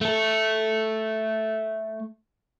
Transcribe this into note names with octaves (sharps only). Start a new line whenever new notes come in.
A3 A4